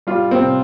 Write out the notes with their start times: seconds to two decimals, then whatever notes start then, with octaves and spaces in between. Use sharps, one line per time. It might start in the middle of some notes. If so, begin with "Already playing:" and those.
0.07 G3 F4
0.31 C3 C4